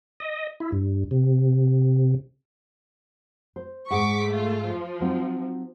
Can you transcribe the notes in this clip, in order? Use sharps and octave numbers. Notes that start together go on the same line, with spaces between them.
D#5
E4
G2
C3
C5
G#2 G#4 F#5 C#6 D6 B6
A3 F4
F3
F#3 C4 D#4